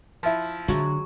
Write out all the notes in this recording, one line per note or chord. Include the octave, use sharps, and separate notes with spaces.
F3 E4
D3 F#3 G#3 F#4